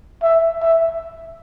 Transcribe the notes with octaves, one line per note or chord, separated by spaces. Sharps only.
E5
E5